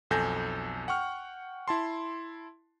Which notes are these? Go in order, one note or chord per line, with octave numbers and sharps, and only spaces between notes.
B1 F2 A4 G#5 G6 A#6
F#5 G5 C#6 F6
E4 A5 C6